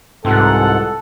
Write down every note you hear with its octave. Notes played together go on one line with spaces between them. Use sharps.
C2 G#2 E3 F4 A4 F#5